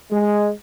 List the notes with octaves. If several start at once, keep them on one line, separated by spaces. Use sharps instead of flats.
G#3